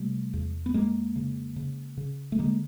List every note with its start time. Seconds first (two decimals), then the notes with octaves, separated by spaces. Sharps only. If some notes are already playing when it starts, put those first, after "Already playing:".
Already playing: C3 G3 A3
0.34 E2
0.66 B3
0.74 F2 G#3 A#3
1.16 C#3
1.56 C#3
1.97 C#3
2.32 A3
2.39 D3 G#3 A#3